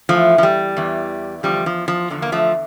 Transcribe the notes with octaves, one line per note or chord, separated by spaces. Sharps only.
E2 E3 F3 A3
F3
G3
E2 E3
E2 D3 F3 G3
F3
F3
E2 D3 F3
A#3
F3 A3